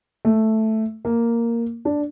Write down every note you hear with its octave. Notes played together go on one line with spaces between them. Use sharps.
A3
A#3
D4